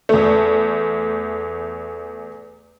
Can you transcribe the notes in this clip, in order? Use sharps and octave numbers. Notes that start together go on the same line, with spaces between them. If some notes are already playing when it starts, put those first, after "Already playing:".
E2 A3